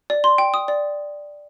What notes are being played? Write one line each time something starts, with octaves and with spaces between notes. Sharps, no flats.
D5
C6
G5
D#6
D5